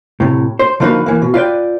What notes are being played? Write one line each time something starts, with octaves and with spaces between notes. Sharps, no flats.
A2 C3
C5
D3 F3 A#3 D#4 F#4 B4
E3 A#3
B2
F4 B4 D5 G5